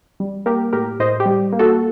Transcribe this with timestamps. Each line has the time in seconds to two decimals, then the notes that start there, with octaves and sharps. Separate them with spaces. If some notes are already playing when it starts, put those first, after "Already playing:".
0.20 G3
0.46 A#3 G4 A#4
0.73 A2 G4 A#4
1.00 A2 C5 D#5
1.20 G4
1.26 G3
1.52 A#3
1.59 F#4 A4